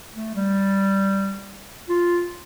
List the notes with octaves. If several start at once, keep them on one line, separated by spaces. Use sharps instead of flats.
A3
G3
F4